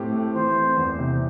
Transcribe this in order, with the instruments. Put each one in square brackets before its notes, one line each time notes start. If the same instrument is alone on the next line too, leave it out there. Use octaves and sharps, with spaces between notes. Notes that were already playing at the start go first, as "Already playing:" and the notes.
Already playing: [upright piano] A2 C4 G4
A3
[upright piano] E3 [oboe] C5
[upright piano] C4
E2
C3